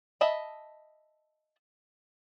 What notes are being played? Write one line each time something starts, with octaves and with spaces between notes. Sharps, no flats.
D#5 E5 A5 B5